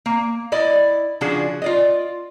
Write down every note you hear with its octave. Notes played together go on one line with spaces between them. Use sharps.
A#3
E4 D5 D#5
C#3 F3 D4 F#4 G#4
F4 D5 D#5